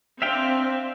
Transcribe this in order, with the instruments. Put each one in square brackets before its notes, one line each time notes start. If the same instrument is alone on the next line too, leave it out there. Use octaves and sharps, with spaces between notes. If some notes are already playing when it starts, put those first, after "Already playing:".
[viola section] C4 D4 [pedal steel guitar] E5 F5 G5